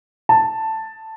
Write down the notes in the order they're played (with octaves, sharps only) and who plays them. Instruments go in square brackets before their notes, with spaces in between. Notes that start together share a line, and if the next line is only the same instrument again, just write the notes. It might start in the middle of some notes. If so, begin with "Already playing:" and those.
[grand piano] A5